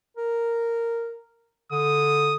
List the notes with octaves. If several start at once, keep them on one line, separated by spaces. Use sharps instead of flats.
A#4
D3 D#6